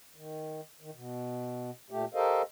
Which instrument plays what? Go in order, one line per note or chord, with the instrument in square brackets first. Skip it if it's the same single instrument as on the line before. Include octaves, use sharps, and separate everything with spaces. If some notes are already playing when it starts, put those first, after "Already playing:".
[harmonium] D#3
D#3
B2
A#2 A3 G4
G4 A4 A#4 C5 D#5 F5